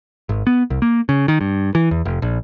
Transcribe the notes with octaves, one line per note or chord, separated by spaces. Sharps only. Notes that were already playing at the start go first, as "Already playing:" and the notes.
G#1
B3
C2
A#3
C#3
D#3
G2
E3
E2
F1
A#1